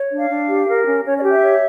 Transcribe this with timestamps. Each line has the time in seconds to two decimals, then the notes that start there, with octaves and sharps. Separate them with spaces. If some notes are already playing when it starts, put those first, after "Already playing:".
Already playing: C#5
0.11 D4
0.17 F5
0.29 D4
0.48 G4
0.67 A#4
0.85 C#4
1.04 C#4 C#5
1.17 D5
1.23 G4
1.30 E5
1.42 C#5